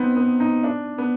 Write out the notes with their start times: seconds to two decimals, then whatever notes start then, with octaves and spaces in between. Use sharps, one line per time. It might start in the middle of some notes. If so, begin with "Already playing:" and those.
Already playing: B3 C4 D#4
0.16 B3
0.40 D#4
0.63 D4
0.98 B3